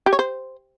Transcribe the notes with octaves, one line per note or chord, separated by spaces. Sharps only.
G4
C#5
C5